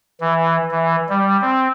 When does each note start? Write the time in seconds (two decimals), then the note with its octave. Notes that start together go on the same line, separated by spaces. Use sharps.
0.20 E3
0.71 E3
1.09 G3
1.41 C4